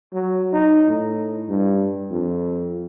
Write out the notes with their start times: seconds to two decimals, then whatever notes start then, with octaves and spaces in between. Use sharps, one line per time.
0.13 F#3
0.53 D#4
0.88 A2
1.49 G2
2.11 F2